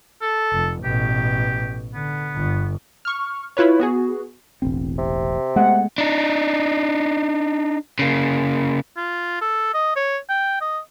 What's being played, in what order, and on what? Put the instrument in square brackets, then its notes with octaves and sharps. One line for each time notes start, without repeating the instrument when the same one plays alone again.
[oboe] A4
[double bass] F1
[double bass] A1 B2 [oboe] G4
[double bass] D3 [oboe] B3
[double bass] G1
[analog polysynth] C#6 F6
E4 F4 B4 C#5
B3 F#4 G#4
[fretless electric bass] E1 A1 C4
[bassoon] C3
[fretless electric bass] G#3 A3 B3 [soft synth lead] F#5
[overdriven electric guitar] D4 D#4
C#3 A#3
[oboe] F4
A4
D#5
C#5
G5
D#5